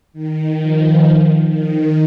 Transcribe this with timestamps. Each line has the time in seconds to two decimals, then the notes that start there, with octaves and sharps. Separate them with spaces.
0.13 D#3
0.58 F3
1.47 D#3